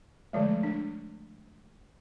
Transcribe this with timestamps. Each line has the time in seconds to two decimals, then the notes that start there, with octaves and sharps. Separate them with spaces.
0.33 D3 F3 G#3 A3
0.63 D4